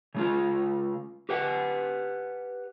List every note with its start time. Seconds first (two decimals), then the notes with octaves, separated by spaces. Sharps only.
0.15 C#3 G#3 F4
1.29 G4 B4 F#5